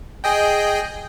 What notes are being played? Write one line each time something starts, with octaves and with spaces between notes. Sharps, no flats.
G#4 D#5 G5